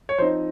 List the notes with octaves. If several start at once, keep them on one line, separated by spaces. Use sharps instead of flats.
C#5
F3 C4 D#4 C5